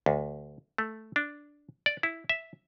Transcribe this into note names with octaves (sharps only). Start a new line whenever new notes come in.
D2
A3
D4
D5
E4
E5